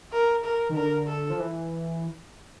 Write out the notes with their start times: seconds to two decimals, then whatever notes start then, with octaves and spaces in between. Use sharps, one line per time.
0.12 A#4
0.44 A#4
0.69 D#3
0.75 D3 A#4
1.07 A4
1.30 F3
1.40 E3